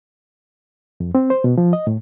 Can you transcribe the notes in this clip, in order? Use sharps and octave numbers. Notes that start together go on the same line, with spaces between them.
F2
C4
C5
B2
F3
D#5
A2